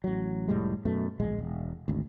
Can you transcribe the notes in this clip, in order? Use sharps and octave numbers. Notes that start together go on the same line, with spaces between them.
A1 F#3
F1 A2 G3 G#3
F#2 B2 A3
D1 A#1 G#3
E1
G#1 D2